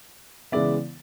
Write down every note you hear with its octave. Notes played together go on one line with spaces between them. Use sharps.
C#3 E3 G#3 B3 D5 E5